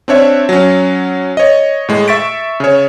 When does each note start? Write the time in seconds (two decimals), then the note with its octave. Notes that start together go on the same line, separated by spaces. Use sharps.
0.08 C4 D4 C#5 E5
0.49 F#3 C#4
1.37 C#5 D#5
1.89 A2 G#3
2.08 E5 C#6 A6 B6 D7
2.60 C#3 C#5